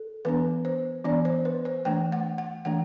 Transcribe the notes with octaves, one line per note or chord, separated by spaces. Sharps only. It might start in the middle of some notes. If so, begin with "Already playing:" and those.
Already playing: A4
E3 B3 D4 B4
C5
E3 B3 D4 D5
C5
B4
C5
E3 A3 D4 G5
F#5
F#5
E3 A3 D4 F#5